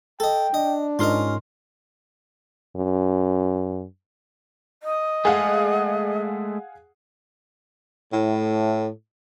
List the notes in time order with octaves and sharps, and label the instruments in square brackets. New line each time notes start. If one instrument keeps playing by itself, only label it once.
[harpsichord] A4 D#5 [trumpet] G5
[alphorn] D4 [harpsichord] D#5
[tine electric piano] G#2 C6 F6 [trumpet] C#4 [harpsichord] F4 A#4 D#5
[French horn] F#2
[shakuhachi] D#5
[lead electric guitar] G#3 A3 [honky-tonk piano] G#4 F5 F#5
[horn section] A2